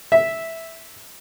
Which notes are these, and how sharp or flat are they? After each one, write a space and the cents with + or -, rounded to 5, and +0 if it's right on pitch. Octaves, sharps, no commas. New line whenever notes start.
E5 -5